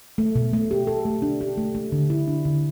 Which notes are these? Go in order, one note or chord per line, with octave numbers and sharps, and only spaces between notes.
A3
B2
A3
G4
A4
A3
D4
G4
A3
A3
D3
E4
D4
D3